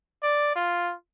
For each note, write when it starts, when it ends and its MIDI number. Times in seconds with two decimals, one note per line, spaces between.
0.23 0.52 74
0.56 0.94 65